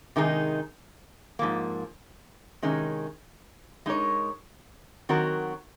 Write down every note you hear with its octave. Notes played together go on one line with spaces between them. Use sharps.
C3 D#3 G#3 D#4 G#4
G#2 F3 A#3
C3 D#3 G#3 C#4
G#3 D#4 A#4 C#5
D#3 F#3 C4 F#4 A#4